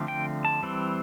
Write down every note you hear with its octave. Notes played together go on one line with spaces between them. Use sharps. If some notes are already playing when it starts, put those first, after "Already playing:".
Already playing: D3 F3 A3 C4
G5
A5
E3 G3 C4